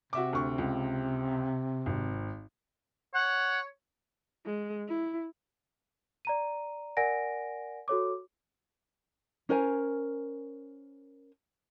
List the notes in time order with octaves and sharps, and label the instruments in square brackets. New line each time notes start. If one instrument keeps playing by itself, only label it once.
[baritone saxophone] C3 [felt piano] F#4 E5 D6
[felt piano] D2 C#6
C#2
G#1
[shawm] C#5 [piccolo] F#5
[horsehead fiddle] G#3
E4
[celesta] D5 A#5 D#7
A#4 D5 F#5 G#5 A#6 D7
F#4 A4 C#5 D6
[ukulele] C#4 A#4 C5 G#5